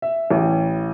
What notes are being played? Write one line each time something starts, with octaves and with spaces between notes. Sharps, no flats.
E5
A1